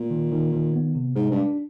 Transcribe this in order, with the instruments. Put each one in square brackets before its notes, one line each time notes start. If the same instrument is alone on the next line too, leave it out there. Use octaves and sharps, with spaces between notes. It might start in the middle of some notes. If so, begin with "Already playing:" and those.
Already playing: [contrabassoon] A#2
[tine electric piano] D#3
D#3
D#3
B3
C3
[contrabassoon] G#2 [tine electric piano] G#3
[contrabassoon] G2
[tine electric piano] D4